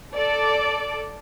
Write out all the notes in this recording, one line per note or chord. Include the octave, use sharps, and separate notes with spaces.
A4 D5